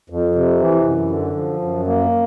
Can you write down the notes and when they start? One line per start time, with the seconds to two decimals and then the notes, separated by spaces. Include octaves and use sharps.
0.10 F2
0.35 C3
0.60 E3
0.86 F#2
1.11 D3
1.36 F3
1.61 F#2
1.87 A#3